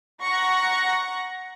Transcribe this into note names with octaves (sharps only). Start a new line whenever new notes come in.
F#5 A#5 C#6 A#6